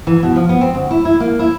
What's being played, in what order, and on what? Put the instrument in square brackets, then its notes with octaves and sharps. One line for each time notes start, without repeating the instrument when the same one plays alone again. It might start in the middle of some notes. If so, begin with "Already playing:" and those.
[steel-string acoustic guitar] E3
B2
F3
B3
C4
D2
E4
E4
A#3
E4